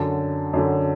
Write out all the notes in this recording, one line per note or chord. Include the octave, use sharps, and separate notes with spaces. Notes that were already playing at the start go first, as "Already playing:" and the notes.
Already playing: F#2 D3 A5
F#2 D3